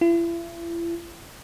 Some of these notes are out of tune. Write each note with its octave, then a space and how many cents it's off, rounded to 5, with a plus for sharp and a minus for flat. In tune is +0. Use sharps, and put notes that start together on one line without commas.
E4 +40